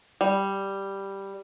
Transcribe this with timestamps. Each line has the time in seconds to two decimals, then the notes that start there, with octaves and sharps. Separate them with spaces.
0.21 G3